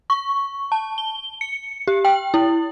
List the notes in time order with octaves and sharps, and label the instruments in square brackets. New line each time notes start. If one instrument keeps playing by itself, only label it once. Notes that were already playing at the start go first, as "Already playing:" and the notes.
[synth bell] C#6
A5
G7
C#7
G4
G5
E4